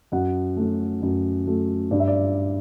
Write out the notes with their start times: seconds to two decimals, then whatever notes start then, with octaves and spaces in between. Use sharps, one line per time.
0.12 F#2 F#5
0.56 F#3 A3
1.02 F#2
1.47 F#3 A3
1.91 G2 D5
2.00 E5
2.08 D5